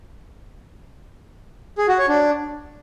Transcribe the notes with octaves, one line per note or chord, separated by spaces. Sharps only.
G#4
F#4
C#5
D4